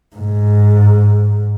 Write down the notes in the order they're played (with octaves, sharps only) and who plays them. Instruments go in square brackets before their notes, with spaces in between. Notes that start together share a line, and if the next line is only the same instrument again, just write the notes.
[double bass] G#2